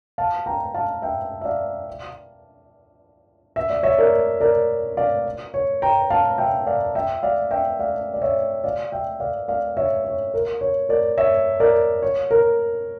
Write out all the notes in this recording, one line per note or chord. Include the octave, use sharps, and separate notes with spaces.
F5 A5
G5 A#5
F5 A5
E5 G5
E5
D5 F5
E5
D5
C#5 E5
A#4 D5
A#4 D5
D5 F5
C#5
G5 A#5
F5 A5
E5 G5
D5 F5
E5 G5
D5 F5
E5 G5
D5 F5
D5
C#5 E5
D5 F5
E5 G5
D5 F5
D5 F5
C#5 E5
C#5
A#4
C#5
A#4 D5
C#5 E5
A#4 D5
C#5
A#4